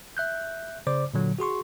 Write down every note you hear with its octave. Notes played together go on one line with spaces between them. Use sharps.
E5 F#6 G6
C#3 C5 D5 D6
A#2 D3 F#3
F#4 G#4 C6 C#6